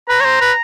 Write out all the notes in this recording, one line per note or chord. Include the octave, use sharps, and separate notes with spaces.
B4 A#5
C#5
C5
B4